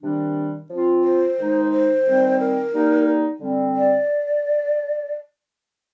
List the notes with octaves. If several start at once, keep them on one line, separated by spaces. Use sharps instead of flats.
C3 D#3 G3 D4
F3 C4 F4
C5
D#3 G#3 D#4
C5
D#3 G3 C4 D#4
A#4
G3 A#3 D#4
D3 G3 C4
D5